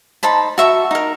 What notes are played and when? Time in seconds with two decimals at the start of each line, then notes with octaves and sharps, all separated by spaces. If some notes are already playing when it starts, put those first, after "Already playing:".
0.23 D#4 C5 A5 B5
0.58 F#4 E5 C#6
0.91 D#4 A#4